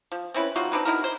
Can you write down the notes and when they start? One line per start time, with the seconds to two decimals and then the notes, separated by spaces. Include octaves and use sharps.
0.12 F3
0.34 C4 C#4 E4 B4
0.56 G3 D#4 F4 F#4
0.72 C4 D4 D#4 B4
0.85 D#4 E4 F#4 A#4
1.04 C5